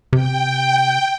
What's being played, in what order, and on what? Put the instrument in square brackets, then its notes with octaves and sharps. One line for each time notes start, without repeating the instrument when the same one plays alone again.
[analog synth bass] C3 [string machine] G5